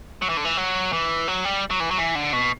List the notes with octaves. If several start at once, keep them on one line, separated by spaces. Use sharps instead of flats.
F#3
E3
D3
E3
F#3
E3
F#3
G3
F#3
E3
F#3
E3
D3
B2